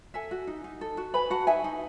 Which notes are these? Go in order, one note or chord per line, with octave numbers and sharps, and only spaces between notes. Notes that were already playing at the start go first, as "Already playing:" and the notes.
A4 E5 G#5
F#4
D#4
D#4
A4
F#4
B4 G#5 B5
F#4 F#5 A5
D#4 E5 G#5
D#4